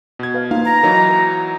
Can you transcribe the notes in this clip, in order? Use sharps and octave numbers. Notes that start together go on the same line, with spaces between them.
B2 G#6
B4 F5
A#3 D#4 F4 F5
A#5
E3 F#3 D#4 A#4